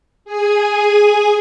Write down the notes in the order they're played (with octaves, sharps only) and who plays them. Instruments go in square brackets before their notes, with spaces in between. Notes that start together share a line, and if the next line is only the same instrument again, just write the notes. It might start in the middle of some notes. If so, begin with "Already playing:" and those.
[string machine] G#4 G#5